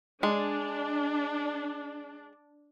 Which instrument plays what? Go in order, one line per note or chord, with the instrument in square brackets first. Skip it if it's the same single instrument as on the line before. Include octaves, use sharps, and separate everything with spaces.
[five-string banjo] G#3 [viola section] D4